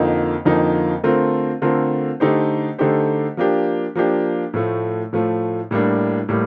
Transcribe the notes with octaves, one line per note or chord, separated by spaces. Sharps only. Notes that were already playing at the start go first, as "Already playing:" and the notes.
Already playing: F2 D3 F3 A#3 D#4
F2 D3 F3 A#3 D#4
D3 A3 C4 F4 A#4
D3 A3 C4 F4 A#4
D3 A3 D#4 G4 C5
D3 A3 D#4 G4 C5
F3 A#3 D4 G4
F3 A#3 D4 G4
A2 F3 A3
A2 F3 A3
A2 G3 A#3 D4
A2 G3 A#3